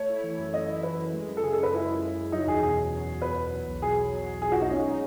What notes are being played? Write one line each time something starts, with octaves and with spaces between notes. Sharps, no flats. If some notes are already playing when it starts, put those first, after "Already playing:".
Already playing: A3 C#5
E4
E3
F#2
A3 D#5
E4
E3 B4
F#2
G#3
F#2
A4
C#3 G#4
F#2 A4
B4
G#3 E4
F#2
C#3
F#2
F#3 D#4
E2 G#4
B2 G#4
E2
F#3
E2
B2 B4
E2
F#3
B1
B2 G#4
B1
F#3
B1
B2 G#4
F#4
B1 D#4
G#3 C#4
D#4